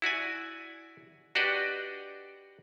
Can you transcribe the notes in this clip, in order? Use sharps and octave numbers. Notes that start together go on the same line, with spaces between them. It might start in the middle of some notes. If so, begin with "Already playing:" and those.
E4 F#4 D5 G#5
D4 F#4 G4 B4 D5 D#5